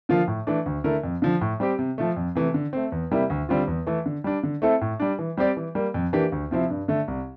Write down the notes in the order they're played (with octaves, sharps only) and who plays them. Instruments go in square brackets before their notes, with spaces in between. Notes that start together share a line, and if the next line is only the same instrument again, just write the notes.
[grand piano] D3 F3 A#3 F4
A2
E3 A3 D4
D2
D3 A3 E4 A#4
F2
D3 F3
A2
G3 C4 G4
C3
F3 A3
F2
C3 E3 A3
D3
A3 C4
E2
C3 G3 A#3 E4
D2
D3 G3 C4 F4
E2
E3 A3
D3
G3 D4
D3
A3 C4 E4 A4
A2
G3 D4
E3
G3 C4 G4 D5
E3
G3 A#3
F2
E3 A#3 D4 G4
D2
C3 F3 C4 E4
G2
D3 A3
C2